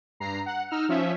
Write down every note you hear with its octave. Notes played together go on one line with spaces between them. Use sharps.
G2 A#5 C7
F#5
D#4 E6 F6
F3 C#4 E5